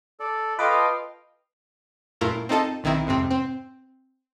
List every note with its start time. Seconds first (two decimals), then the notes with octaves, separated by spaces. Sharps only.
0.20 A4 D5
0.59 F4 A4 B4 D#5 F5 G5 D6
2.21 F#2 A#2 A3 E4 F4 A#4
2.49 C4 D#4 F4 A4 D#5 A5
2.84 B1 D#3 C4 E4 A#5
3.07 F2 G#2 C3 C4
3.31 C4